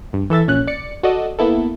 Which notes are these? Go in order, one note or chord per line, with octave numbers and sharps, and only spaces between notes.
G2
E3 A4 E5 A6
A#1 C#4 F#6
D5 C#7
F#4 A4 D5 D#5
A#3 B3 E4 A4